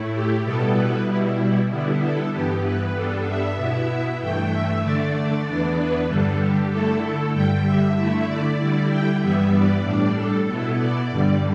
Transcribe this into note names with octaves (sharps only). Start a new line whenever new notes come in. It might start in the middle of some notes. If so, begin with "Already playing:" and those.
Already playing: A2 A3 E4
G4
B2 G3 B3 E4 A4
B4
B2 G3 E4
D3 G3 B3 E4
A4
G2 E3 B3 G4
B4
G2 G3 B3 D4 A4
E5
B2 B3 E4
G2 E3 A3 G5
E5
D3 A3 D4 D5
D5
E2 E3 B3 D4
B4
G2 D3 G3 D4 A4
G4
D3 A3 E4 A4
A4
G2 D3 G3 G5
E5
D3 A3 E4 E5
D5
D3 G3 E4 D5
G5
G2 E3 G3 B3 E5
D5
A2 G3 D4
A4
B2 B3 E4 A4
D5
G2 D3 G3